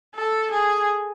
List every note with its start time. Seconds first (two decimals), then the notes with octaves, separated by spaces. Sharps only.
0.15 A4
0.51 G#4